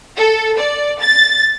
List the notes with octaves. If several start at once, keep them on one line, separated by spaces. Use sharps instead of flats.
A4
D5
A6